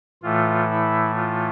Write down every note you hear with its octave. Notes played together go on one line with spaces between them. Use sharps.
A2 E3 A3 F4
E4
F4